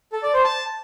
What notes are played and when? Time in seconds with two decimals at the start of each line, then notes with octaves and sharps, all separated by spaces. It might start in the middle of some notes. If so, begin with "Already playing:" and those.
0.12 A4
0.23 D5
0.33 C5
0.44 A5